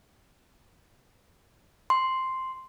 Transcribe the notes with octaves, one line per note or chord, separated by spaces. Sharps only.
C6